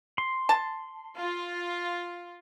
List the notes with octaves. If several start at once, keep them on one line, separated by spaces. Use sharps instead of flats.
C6
A5
F4